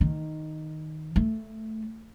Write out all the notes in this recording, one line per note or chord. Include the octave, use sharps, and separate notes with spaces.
D#3
A3